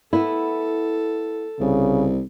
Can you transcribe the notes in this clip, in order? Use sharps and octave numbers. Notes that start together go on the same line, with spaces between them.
B3 E4 A4
C2 C#3